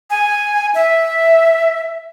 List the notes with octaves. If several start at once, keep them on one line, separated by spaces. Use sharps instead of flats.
G#5
E5